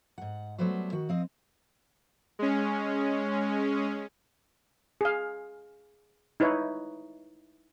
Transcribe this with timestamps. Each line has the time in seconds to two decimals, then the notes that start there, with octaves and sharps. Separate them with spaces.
0.18 G#2 F#5
0.58 F#3 G3 A3 B3 B4 C5
0.92 D#3 F#4
1.09 F3 C4 D#5
2.39 G#3 C#4
5.01 G#4 F5
6.40 D#4 E4 B4 C#5